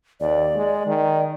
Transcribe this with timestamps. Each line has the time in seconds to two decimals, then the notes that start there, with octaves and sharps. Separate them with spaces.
0.20 D#2 D5
0.55 G#3
0.87 D#3